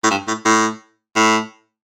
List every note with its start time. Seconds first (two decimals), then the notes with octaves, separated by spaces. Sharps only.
0.03 A2
0.11 G2
0.27 A2
0.45 A2
1.16 A2